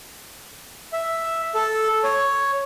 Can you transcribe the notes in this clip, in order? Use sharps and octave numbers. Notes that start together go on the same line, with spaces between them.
E5
A4
C#5